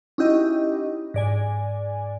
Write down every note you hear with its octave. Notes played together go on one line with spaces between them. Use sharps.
C#4 D#4 E4 F#4 G4 D#5
G#2 D5 G#5